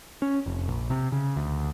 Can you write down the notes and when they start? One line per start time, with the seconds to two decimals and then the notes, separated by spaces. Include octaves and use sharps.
0.22 C#4
0.46 F1
0.68 A#1
0.90 C3
1.12 C#3
1.36 D2